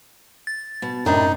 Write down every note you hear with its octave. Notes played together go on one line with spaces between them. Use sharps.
A6
B2
F#2 A2 C3 D4 D#4